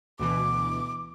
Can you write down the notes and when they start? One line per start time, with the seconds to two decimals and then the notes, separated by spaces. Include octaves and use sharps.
0.19 D2 B2 E3 D6